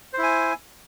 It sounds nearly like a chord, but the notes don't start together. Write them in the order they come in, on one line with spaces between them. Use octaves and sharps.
C5 E4 G#5